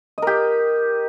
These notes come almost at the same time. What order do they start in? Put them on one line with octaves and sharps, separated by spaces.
D#5 A#4 G4